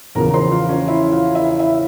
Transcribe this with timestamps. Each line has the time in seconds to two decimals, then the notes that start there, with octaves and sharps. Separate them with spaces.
0.15 E2 C#3 F3 A#4 A#5
0.34 C5 C6
0.51 F4 F5
0.69 C#4 C#5
0.87 E4 E5
1.11 F4 F5
1.35 E4 E5
1.59 E4 E5